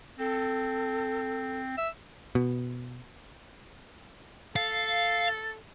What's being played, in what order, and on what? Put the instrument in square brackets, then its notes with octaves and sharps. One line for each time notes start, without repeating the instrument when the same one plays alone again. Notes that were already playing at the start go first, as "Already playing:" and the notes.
[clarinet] C4 [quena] A4
[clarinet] E5
[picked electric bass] B2
[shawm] A4 [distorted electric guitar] F5